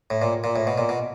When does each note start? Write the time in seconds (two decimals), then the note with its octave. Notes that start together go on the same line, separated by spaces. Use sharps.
0.10 A2
0.22 A#2
0.44 A#2
0.56 A2
0.67 B2
0.78 A#2
0.89 B2